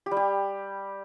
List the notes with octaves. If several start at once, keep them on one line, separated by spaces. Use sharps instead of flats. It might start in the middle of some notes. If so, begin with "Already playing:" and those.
G4
G3
G4